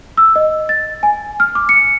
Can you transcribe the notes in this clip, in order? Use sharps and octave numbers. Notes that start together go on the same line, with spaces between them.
E6
D#5
A6
G#5
F6
D6
C#7